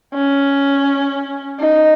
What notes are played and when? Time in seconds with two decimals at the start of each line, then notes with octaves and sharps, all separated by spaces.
0.14 C#4
1.60 D#4